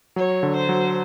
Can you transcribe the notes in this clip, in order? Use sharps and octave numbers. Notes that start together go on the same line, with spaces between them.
F#3 C#5
D3
C5
F#3